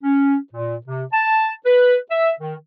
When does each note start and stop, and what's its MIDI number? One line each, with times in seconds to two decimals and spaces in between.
0.03 0.36 61
0.53 0.76 46
0.87 1.03 48
1.13 1.51 81
1.66 1.96 71
2.11 2.32 76
2.40 2.55 51